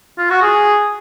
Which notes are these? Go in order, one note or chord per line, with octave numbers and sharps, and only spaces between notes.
F4
F#4
G#4